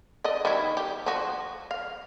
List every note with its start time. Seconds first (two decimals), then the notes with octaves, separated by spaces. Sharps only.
0.24 D5 D#5
0.45 D#3 G3 E4
0.77 G4
1.06 F3 F#4
1.71 F5